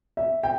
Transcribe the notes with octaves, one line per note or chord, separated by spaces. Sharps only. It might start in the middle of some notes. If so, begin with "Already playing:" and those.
E5
G5